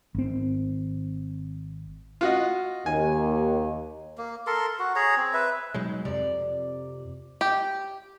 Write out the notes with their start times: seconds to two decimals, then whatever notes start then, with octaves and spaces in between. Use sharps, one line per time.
0.15 G#1 C4
2.21 F4 F#4 D#5
2.86 D#2 G#5
4.18 A#3
4.47 A4 A#4 C6
4.79 F#4
4.96 G#4 C#5 A#5
5.17 C4
5.34 B4 E5
5.74 B2 F#3 G#3 D#4
6.05 F2 C3 D5
7.41 G4